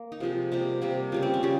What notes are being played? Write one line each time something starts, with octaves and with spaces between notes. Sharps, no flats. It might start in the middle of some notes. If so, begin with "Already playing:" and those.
Already playing: A#3
D#4
C3 F3 G#3 F4
C3 G3 A#3 G4
C3 G3 A#3 G4
C#3 G3 A#3 F4
C4
C#4
C#3 G3